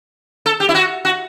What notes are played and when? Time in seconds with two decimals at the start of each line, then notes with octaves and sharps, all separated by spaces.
0.46 A4
0.60 G4
0.69 E4
0.75 F#4
1.05 F#4